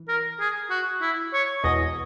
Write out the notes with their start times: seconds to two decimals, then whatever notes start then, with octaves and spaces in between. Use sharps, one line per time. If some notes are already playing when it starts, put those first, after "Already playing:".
Already playing: E3
0.08 A#4
0.40 G#4
0.70 F#4
1.01 E4
1.34 C#5
1.64 E2 B2 G#3 D#5